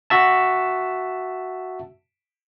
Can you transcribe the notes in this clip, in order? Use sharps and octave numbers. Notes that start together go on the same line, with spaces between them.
F#4 E5 A5